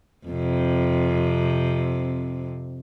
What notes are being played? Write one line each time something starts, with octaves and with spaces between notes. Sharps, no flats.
F2 C3